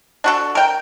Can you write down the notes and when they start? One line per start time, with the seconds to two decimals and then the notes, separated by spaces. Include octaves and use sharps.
0.24 D4 F#4 A4
0.55 A#4 G5